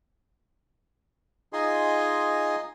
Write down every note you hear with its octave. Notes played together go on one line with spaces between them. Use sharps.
D#4 F4 G#4 D#5 G#5 C6